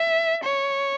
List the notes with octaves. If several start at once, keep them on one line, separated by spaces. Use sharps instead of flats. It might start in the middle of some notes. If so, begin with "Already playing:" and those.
Already playing: E5
C#5